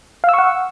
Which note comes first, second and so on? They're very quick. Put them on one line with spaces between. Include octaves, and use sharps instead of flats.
F5 E6 C#6 F#5